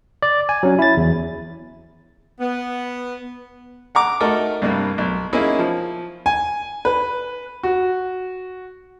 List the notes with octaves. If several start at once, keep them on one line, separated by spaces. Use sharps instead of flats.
D5
G#5
F#3 C#4
E4 A6
E2
B3
F#5 A#5 D6
A3 D#4 F#4 A4 A#4
C2 G2 A#3
B1
A#3 C#4 D#4 E4 G#4
F3
G#5
B4
F#4